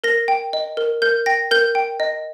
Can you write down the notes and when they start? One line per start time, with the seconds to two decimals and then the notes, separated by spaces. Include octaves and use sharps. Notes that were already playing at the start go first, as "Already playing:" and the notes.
0.04 A#4 A#6
0.28 G5
0.53 D#5
0.77 A#4
1.02 A#4 G6
1.26 G5 A#6
1.51 A#4 G6
1.75 G5
2.00 D#5